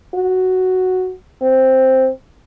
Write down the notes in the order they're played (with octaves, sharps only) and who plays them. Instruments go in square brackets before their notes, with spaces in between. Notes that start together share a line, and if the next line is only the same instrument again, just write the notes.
[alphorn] F#4
C4